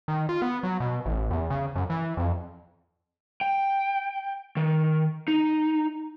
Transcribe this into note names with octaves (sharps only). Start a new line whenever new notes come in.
D#3
F4
B3
F#3
B2
A1
E2
C#3
F#2
E3
F2
G5
D#3
D#4